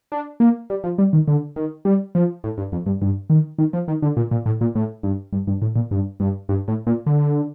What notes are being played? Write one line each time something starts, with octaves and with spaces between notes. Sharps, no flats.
D4
A#3
G3
F3
G3
D#3
D3
D#3
G3
F3
A2
G2
F2
G2
G2
D#3
D#3
F3
D#3
D3
A#2
A#2
A2
A#2
A2
G2
G2
G2
A2
A#2
G2
G2
G2
A2
A#2
D3